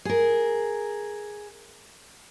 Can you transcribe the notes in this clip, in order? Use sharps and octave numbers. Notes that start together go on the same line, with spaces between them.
G#4 A#4